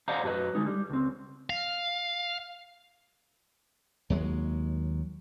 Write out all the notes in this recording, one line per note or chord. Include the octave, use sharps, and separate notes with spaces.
C5 D5 D#5 F5 F#5 A#5
F#2 F#3 G4 G#4 B4 D#5
D3 G#3 D#4
G3
C#2 C4
F5
D#2 F#3 G#3